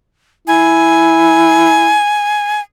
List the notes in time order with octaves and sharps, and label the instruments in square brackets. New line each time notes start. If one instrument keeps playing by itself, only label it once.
[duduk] E4 [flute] G#5